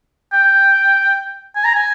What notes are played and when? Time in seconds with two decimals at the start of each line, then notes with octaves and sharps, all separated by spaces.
0.32 G5
1.55 G#5
1.65 A#5
1.75 G#5